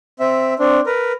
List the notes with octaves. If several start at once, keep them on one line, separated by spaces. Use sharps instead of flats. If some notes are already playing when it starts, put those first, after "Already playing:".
C4 E5
C4 D4
A#4 B4